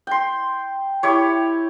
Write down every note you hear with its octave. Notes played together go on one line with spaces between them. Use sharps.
G5 C6
E4 G4 C#5